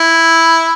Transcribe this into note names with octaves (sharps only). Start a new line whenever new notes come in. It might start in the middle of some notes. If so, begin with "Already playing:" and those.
Already playing: E4